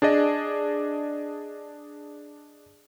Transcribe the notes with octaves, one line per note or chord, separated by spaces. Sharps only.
D4 G#4 D5 D#5